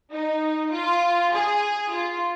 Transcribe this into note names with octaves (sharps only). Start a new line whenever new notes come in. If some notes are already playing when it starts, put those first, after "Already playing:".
D#4
F4
G#4
F4